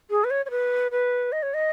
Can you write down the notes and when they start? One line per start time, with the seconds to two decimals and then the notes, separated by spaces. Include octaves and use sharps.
0.10 G#4
0.24 B4
0.30 C#5
0.46 C#5
0.51 B4
0.91 B4
1.32 D#5
1.43 C#5
1.54 D#5